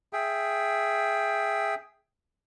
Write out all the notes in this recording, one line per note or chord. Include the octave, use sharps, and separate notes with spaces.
G#4 E5 G5